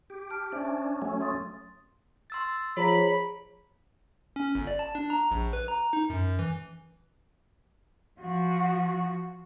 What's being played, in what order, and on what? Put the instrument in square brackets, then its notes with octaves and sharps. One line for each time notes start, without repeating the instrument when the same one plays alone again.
[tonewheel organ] G4
[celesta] A5 F6 D7
[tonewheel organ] C#4 D4 [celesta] C5 E5
[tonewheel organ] F#3 A3 C#4 [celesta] G#5
[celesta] C6 D#6 A6
[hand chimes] C6 E6 A6
[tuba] F3 [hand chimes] G#4 A#5 [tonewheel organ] C#5 [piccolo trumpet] B5
[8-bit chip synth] C#4
G1
D5
A5
D4
A#5
A#1
B4
A#5
D#4
F#2
E3
[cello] F3 F#4